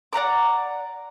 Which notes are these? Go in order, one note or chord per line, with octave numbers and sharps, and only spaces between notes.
D5 F#5 A#5 D6